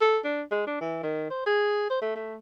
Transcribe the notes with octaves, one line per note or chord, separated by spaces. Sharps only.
A4
D4
G#3
D4
E3
D#3
C5
G#4
C5
A3
A3